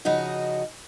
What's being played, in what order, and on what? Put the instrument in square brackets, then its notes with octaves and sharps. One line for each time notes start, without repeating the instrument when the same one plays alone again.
[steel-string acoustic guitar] C#3 F3 D#4 F#4 D#5